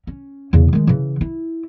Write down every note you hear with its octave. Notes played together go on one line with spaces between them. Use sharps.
C#4
E2 C#3
D#3 G#3
C#3 E3
E4